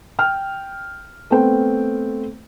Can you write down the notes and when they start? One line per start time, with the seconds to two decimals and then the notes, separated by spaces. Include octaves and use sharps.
0.19 G5 F6
1.30 A3 B3 C4 C5 G5